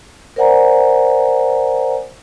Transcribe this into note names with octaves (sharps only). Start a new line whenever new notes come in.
A#4 C5 D5 F#5 G#5 A#5